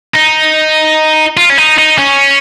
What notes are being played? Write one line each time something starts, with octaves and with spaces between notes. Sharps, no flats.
D#4
F4
C#4
D#4
D#4
C#4